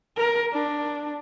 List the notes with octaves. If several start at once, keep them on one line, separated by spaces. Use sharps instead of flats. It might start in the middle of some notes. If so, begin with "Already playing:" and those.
A#4
D4